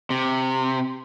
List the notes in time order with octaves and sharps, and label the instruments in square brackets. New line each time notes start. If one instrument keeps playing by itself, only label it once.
[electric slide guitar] C3